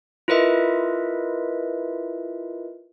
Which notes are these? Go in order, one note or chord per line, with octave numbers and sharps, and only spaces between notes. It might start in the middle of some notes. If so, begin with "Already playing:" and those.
E4 F4 A#4 B4 D#5 E5